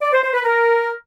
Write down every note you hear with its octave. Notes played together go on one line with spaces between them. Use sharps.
D5
C5
C5
B4
A#4